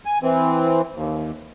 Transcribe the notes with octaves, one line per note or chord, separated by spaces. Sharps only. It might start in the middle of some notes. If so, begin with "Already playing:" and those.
G#5
E3 C4
D#2